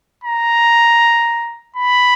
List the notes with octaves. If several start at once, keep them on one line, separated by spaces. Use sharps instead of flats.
A#5
B5